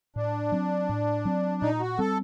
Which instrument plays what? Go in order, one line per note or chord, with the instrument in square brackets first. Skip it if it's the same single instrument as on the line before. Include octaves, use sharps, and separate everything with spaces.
[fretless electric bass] A2 [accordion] D4
[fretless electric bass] F#3 C4
A2
F#3 C4
[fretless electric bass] A#2 [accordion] D#4
[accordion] F#4
[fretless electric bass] G3 C4 [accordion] A4